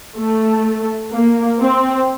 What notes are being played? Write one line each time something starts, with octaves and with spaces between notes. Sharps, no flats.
A3
A#3
C4